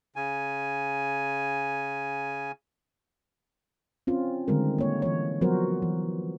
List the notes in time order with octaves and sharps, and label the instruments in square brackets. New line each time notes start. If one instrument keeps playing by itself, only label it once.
[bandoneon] C#3 G#5
[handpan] C4 C#4 F4
D3 D#3 G3 G#3 C4 A#4
A#3 C#5
E3 C#5
F3 F#3 B3 F#4 A#4 C5
E3